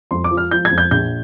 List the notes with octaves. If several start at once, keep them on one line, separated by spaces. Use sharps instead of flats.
F2 C6
D6
F3
F6
F3 G6
G#6
F2
G6
A#1 G6